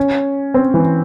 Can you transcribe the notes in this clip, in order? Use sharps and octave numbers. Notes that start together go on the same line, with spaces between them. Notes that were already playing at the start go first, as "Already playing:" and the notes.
Already playing: C#4
C4
E3